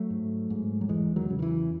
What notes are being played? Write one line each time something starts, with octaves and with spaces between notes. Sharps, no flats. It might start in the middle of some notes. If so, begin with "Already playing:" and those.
Already playing: F#3 A3
G#2
G#2
F#3
E2 E3 G#3
D#3 F#3
C#3
D#3
E3